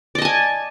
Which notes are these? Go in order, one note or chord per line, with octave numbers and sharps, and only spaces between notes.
D5 D#5 G#5 A5